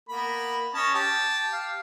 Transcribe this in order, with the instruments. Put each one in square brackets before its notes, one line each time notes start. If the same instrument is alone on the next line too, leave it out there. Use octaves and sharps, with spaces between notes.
[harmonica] A#3 B3 B5
[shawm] C#4 [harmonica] C#5 D#5 A5
[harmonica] G4 [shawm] A5
[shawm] F5